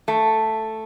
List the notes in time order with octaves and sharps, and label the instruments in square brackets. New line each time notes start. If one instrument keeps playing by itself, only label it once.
[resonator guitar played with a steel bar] A3